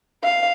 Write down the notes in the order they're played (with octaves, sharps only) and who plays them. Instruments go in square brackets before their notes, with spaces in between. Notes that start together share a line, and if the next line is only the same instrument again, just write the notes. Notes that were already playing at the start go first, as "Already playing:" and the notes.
[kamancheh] F5